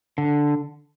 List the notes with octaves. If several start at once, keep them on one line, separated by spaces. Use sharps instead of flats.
D3